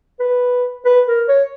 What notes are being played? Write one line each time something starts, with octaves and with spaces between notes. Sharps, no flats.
B4
B4
A#4
C#5